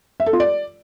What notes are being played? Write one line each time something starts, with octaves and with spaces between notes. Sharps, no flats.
E5
A4
F4
D5